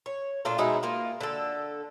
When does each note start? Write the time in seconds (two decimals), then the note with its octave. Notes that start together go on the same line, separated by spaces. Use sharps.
0.06 C#5
0.45 A#2 D4 F4 A4
0.58 B2 G#3 D#4 E4
0.83 A#3 F4
1.21 D3 A4